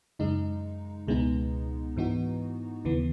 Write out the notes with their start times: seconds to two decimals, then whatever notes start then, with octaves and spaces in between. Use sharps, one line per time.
0.19 F#2 C#3 G#3 D#4
1.07 C#2 B2 G#3 B3 D#4
1.96 G#2 E3 B3 D#4 F#4
2.85 D#2 C#3 E3 B3